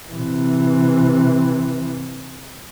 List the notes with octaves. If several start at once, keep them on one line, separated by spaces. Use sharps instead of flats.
C3 E3